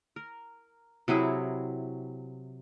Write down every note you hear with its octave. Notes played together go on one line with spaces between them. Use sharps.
A#4
C3 F#3 E4 G#4